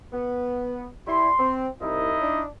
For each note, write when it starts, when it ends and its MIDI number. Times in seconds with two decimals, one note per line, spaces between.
0.13 0.87 59
1.07 1.31 55
1.07 1.31 64
1.07 1.53 84
1.39 1.67 60
1.81 2.16 36
1.81 2.42 63
1.81 2.42 64
1.81 2.42 75
2.22 2.46 62